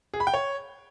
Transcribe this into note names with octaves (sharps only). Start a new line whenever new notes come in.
G#4
B5
G5
C#5